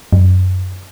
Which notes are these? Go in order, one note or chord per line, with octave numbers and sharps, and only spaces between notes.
F#2